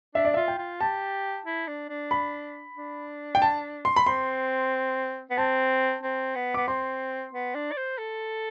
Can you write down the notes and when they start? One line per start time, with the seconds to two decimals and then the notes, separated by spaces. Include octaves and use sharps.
0.15 D4 E5
0.25 D5
0.34 F4 E5
0.48 G5
0.58 F4
0.80 G4 A5
1.46 E4
1.67 D4
1.89 D4
2.11 B5
2.77 D4
3.35 G5
3.42 A5
3.85 C6
3.96 B5
4.06 C4 C6
5.30 B3
5.37 C4 A5
6.03 C4
6.35 B3
6.54 B3 D6
6.68 C4 C6
7.33 B3
7.55 D4
7.72 D5
7.77 C5
7.98 A4